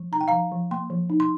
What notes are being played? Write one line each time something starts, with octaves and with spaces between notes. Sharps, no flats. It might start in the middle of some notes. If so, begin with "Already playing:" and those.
Already playing: F3
D#4 A#5
G5
F3 F5 A#5
F3
A#3 G5 C6
F3
D#4
C6